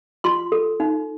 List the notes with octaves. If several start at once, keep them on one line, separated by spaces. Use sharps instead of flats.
F4 C6
A4
D#4